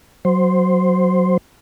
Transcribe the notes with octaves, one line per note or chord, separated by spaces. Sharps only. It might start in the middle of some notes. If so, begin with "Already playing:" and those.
F#3 C5